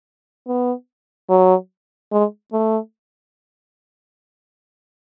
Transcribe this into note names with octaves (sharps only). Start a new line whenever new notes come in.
B3
F#3
G#3
A3